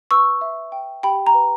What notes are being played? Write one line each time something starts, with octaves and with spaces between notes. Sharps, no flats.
B4 C#6 E6
E5
G5
G4 G5 B5
A#5
B4